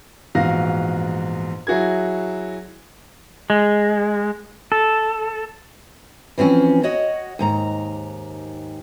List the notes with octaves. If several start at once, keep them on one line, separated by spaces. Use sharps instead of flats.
A#1 E2 G#2 F#4 F5 A#6
F#3 E4 F#4 G#4 G#6
G#3
A4
E3 F3 C4 C#4
F#4 C#5 D#5 F#5
D#2 G#2 A#5